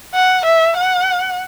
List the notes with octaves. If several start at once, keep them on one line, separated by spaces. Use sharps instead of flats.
F#5
E5
F#5